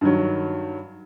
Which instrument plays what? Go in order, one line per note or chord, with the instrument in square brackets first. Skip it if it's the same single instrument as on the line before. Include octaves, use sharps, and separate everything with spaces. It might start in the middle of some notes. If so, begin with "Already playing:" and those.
[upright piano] G2 D#3 F#3